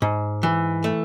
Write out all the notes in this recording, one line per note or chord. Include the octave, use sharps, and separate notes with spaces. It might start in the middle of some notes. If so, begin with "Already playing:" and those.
G#2
E3
A3